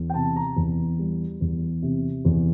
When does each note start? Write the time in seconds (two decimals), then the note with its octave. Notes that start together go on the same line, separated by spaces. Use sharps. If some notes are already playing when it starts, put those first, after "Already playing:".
Already playing: E2
0.10 G5
0.14 C3 A5
0.36 A#5
0.56 E2
0.99 G3
1.41 E2
1.82 C3
2.25 E2